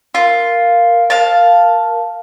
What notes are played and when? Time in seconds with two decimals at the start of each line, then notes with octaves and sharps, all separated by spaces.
0.15 F4 A#4
1.10 F5 A5